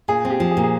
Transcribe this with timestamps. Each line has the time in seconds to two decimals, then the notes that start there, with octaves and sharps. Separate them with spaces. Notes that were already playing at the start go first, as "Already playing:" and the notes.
0.08 A#2 G#4
0.25 C4
0.30 G4
0.40 F3
0.51 G#4
0.57 A#2
0.63 G#4